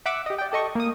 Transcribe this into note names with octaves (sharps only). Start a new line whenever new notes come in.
E5 F#5 D6 E6
G4 D#5
D5 G5
G4 A4 D#5 C#6
A#3 D#6